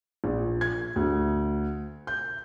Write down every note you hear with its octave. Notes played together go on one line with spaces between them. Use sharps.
A#1
G#6
D2
G6